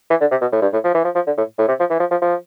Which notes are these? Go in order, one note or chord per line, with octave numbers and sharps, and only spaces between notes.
E3
D3
C3
B2
A2
G2
A2
F3
E3
F3
F3
D3
A2
A2
C3
F3
E3
F3
F3
F3